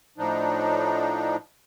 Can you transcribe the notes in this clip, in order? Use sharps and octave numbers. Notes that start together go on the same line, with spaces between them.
A2 F3 D4 D#4